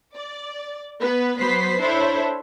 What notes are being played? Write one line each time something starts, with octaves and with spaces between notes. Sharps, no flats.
D5
B3 B4
F#3 B3 B4 C5 B6 C7
D4 E4 A4 C5 C#5